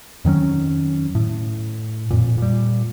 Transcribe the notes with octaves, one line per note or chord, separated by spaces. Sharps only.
F2 D#3 F#3 C#4
A2
F2 A#2
A#2 G3